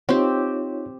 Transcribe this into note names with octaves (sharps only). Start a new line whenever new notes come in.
C4 D#4 F4 G4 C#5